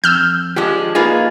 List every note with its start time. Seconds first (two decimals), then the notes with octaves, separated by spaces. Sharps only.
0.04 F2 E6 F6 G6
0.56 F3 G#3 D4 G4
0.95 A#3 D#4 F4 G#4 B4